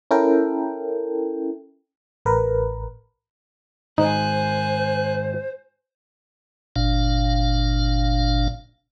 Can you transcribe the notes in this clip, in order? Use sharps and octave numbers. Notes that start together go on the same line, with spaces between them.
C#4 E4 A4 A#4 G5
A1 A#4 B4
G#2 D#3 G#3 D#4 C5 G#5 F#6
G1 A#2 D4 F5